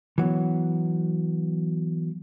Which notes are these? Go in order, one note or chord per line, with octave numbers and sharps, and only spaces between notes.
E3 F#3 B3